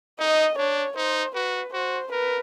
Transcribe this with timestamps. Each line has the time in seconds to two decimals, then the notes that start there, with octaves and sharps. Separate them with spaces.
0.19 D#4 D#5
0.58 D4 C#5
0.97 D#4 C5
1.35 F#4 B4
1.74 F#4 C5
2.12 A#4 B4